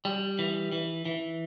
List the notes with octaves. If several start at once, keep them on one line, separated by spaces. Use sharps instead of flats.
G3
E3
E3
E3